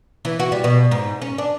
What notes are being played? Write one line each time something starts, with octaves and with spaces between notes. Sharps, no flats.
E3
F#4
G3
B2
G#2
C#4
D4